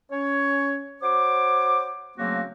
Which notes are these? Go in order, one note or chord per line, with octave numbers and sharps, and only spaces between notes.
C#4 C#5
F#4 C5 C#5 D6
C#3 F#3 A3 A#3 C4 F#4